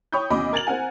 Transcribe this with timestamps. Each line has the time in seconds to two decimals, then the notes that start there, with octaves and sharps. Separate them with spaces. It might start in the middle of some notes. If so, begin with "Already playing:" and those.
0.12 C#5 G5 B5 C#6 D#6 G6
0.30 D2 B2 C#4 D#5 B5 D6
0.53 A#4 G#6 A6 F7 F#7
0.67 C4 A#4 F#5 G#5